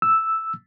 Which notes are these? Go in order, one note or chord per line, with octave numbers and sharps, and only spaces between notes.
E6